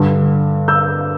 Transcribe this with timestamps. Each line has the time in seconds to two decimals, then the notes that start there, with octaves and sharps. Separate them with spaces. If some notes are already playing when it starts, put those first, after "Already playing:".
Already playing: G2 D3
0.68 E6 G6